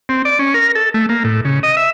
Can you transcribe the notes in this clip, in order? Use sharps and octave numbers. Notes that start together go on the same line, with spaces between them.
C4
D5
C#4
A#4
A4
A3
A#3
A2
C#3
D#5
E5